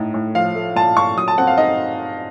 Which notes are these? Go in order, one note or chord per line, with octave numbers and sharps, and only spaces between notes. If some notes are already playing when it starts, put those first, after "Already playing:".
Already playing: A2 D#4
A2
F3 F5
A3
A#2 A5
A#2 C#6
F#3 D#6
A5
C4 F#5
F5
D#4 D#5